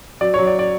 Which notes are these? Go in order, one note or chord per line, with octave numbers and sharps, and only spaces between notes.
F#3 D5
C#5
F#3
D5
D5